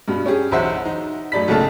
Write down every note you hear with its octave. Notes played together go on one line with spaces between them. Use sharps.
G2 B2
C#4 G4 G#4
B1 E2 C5 E5 F#5
D#4
F#2 A3 D#4 D5 B5 B6
B1 A2 C#3 A#3 A4 A5